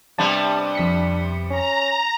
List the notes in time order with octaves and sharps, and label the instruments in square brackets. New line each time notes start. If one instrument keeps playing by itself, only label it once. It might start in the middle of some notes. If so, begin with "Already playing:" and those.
[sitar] C3 G3 B3 [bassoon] D4 [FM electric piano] A5
[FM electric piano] F2 B6 C#7
[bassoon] C#4 [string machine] A#5